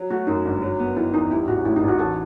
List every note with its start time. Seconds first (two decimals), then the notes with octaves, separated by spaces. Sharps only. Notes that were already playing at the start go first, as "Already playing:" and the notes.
Already playing: F#3
0.10 A3 F#4
0.27 F#2 D#4
0.45 G1
0.62 F#3
0.80 B3
0.97 D#3 E4
1.14 E2 D#4
1.30 G3 E4
1.48 A1 F#4
1.65 A2 E4
1.76 D#4
1.83 A1
1.88 F#4
1.99 E3 A4